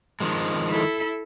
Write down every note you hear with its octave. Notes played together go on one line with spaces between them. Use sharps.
D#3 F3 G#3
E4 A4